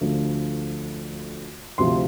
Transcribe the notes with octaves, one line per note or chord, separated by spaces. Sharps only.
D2 D3 F3 A3
D2 C3 F3 C6